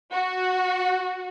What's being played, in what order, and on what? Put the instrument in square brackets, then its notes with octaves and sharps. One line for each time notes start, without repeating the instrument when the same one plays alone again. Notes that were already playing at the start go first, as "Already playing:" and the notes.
[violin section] F#4